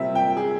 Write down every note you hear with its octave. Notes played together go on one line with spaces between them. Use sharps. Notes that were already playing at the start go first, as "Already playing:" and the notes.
Already playing: C3 G3 C4 E5
G5
G#4